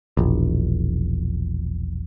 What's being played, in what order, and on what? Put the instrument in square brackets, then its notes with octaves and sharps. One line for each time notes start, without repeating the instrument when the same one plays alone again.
[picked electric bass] E1 A#1